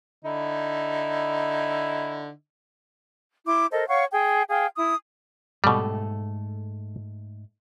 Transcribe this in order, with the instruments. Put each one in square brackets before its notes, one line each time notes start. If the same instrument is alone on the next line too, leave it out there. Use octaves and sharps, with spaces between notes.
[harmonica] D3 D#4 E4
[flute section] E4 C6 D6
A4 A#4 C5 D#5
C#5 F5 F#5 C#6
G#4 G5 G#5
G#4 F5 G5
E4 D#6
[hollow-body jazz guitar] G#2 A3 A4 [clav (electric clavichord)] B2 G3